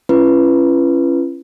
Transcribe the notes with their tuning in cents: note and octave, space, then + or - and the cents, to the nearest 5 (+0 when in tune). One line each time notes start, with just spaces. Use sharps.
C#4 -20 E4 +45 B4 +0